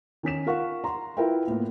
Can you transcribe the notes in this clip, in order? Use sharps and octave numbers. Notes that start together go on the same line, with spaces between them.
D#3 C#4 B6 E7
F4 A#4 F5 F#5 C#6
A#5 C6
E4 F4 A#4 B4 E5 G5
A2 A#3 B3 F4